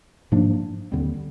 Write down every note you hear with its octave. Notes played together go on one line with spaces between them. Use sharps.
G#2 F3 A#3 D4
D#2 D3 G3 C4